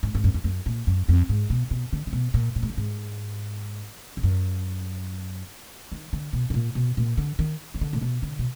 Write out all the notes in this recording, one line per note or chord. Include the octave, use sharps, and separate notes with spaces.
G#2
G#2
F#2
F2
F#2
A#2
F#2
F2
G#2
B2
B2
D3
D3
B2
A#2
A#2
G#2
F#2
G#2
G#2
F#2
D#3
D3
B2
G#2
A#2
B2
A#2
D3
D#3
D#3
D3
A#2
B2
D3
B2